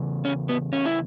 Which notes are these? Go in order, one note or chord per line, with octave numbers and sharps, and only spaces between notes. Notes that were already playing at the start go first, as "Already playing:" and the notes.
Already playing: E2 C#3
C#4
B3
C#4
E4